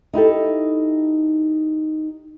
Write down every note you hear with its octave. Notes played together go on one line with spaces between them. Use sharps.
D#4 E4 G4 A4